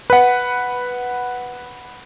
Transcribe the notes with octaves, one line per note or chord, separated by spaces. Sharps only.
B4 F#5